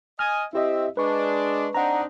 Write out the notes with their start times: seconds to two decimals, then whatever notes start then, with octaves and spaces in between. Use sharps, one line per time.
0.19 D#5 G#5 F6
0.53 C4 E4 G4 D#5 E5
0.97 G#3 D4 B4 C#6
1.75 C4 D4 D#4 F#5 A#5